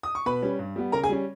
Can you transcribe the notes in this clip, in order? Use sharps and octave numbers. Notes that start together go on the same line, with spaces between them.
D#6
C#6
B2 B4 B5
G3 C#4
G2
G3 B3
C#3 A#4 A#5
G#4 G#5
G3 C#4